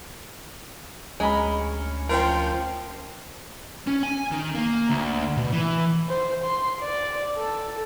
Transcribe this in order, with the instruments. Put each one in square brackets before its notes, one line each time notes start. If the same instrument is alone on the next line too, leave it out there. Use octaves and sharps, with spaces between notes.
[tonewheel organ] D2 C#4 [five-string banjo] G#3 [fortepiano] G#5 A#5 B5
[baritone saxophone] F3 [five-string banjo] A#4 G5
[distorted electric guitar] C#4
G#5
D#3
A#3
D2
B2
E3
[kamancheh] C5
C6
D5
A4